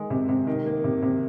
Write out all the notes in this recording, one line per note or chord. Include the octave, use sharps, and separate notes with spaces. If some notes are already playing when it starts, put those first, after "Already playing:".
Already playing: D#3 G#3
C3
C3
D#3
A#3
C3
C3